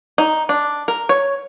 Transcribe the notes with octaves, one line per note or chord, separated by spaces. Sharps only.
D#4
D4
A#4
C#5